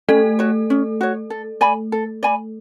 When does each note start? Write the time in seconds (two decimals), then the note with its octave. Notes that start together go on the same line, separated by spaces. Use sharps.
0.09 A3 C#4 A4
0.39 F#4 C#5
0.70 C#4
1.01 F#4 C#5
1.30 A4
1.61 D5 G#5 B5
1.92 A4
2.23 D5 G#5 B5